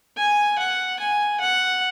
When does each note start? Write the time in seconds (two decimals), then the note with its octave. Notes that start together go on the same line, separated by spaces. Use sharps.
0.17 G#5
0.58 F#5
0.99 G#5
1.40 F#5